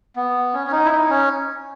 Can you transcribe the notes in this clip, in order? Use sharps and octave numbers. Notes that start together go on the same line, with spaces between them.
B3
C#4
C#4
D#4
E4
D#4
C#4